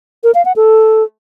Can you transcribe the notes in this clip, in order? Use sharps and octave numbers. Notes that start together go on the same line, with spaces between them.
A#4
F5
F#5
A4